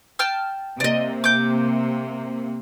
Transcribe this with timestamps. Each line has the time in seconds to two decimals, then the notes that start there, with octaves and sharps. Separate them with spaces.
0.19 G5 A5 F6
0.80 C3 A#3 D5 D#5
1.24 D6 G6